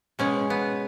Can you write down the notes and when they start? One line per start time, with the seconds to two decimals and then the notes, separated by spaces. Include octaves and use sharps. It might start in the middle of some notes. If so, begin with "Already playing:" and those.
0.19 B2 G#3 C#4
0.50 B3